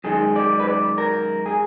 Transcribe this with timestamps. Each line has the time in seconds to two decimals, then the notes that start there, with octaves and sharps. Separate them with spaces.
0.04 F#2 D#3 G#3 G#4
0.36 D5
0.60 B4
0.67 D5
0.98 A#4
1.46 G#4